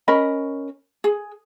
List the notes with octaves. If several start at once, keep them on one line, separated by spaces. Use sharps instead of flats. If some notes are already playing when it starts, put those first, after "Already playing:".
C#4 A#4 D#5 B5
G#4